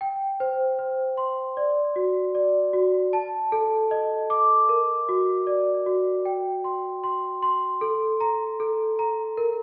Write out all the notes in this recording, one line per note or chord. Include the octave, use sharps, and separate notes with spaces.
G5
C5
C5
C6
D5
F#4
D5
F#4
A5
A4
D#5
D6
A#4
F#4
D5
F#4
G5
C6
C6
C6
A4
A#5
A4
A#5
A#4